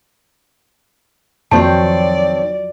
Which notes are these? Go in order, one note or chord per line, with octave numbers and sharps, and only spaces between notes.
F2 D#3 F3 F#3 C4 C#5 D5 A5